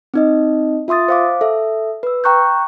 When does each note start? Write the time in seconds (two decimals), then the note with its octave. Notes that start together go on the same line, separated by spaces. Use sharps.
0.14 C4 D#4 D#5
0.88 F4 E5 C6 D#6 A6
1.08 C5 F5 D6
1.41 A4 E5
2.03 B4 E6
2.24 G5 A#5 C#6 F#6 G6